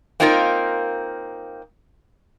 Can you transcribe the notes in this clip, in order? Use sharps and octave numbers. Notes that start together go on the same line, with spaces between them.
A#3 C4 D#4 F4 F#4 A#4